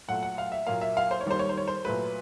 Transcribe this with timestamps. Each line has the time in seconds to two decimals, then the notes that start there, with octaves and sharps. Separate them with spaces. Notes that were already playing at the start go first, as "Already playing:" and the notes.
0.08 A#2 F#3 A3 F#5
0.23 F#5
0.38 F5
0.52 E5
0.67 A#2 F#3 A#3 F5
0.81 E5
0.97 F5
1.11 C5
1.21 C#5
1.26 D#3 G3 A#3 C5
1.39 C#5
1.49 C5
1.58 C#5
1.67 C5
1.85 A#2 F#3 A3 B4